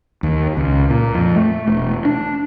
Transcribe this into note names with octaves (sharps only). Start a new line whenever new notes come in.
D#2
C#2
A#2
F2
A3
E1
D4